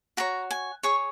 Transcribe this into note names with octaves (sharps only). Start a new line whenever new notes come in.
F#4 C#5 A#5
G#5
G#4 C#5 C#6